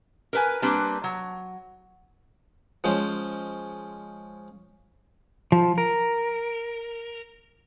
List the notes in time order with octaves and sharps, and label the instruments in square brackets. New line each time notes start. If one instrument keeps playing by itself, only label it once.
[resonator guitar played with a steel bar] A#4 B4 G#5
G3 A#3 C4 D4 B4
F#3
[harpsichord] F3 G#3 C#4 C5
[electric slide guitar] F3
A#4